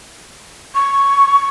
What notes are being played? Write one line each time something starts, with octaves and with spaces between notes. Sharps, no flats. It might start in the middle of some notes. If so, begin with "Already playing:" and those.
C#6